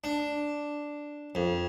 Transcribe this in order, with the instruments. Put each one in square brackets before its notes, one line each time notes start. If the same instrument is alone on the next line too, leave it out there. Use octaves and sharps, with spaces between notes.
[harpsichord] D4
F2